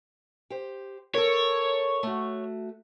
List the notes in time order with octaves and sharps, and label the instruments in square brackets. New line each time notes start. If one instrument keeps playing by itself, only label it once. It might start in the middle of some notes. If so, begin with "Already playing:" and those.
[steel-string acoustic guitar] G4 C5
[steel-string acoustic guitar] A4 A#4 [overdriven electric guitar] C#5
[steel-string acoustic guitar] A3 F#4